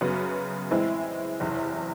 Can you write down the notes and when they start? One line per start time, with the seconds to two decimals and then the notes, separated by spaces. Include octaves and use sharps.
0.01 F#2 C#3 F#3 B3
0.71 A2 E3 G#3 C4 E4
1.40 F#1 E2 C3 E3